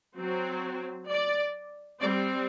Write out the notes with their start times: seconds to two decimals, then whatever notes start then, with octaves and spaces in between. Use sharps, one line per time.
0.18 F#3 C4
1.10 D5
2.01 G3 C4 D5